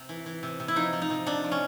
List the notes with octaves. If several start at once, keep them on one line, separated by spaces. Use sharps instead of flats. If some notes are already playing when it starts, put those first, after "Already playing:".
Already playing: C3
E3
E3
C3
C3
E4
F3 D#4
F3
D#4
C3
C3 D4
F3
C#4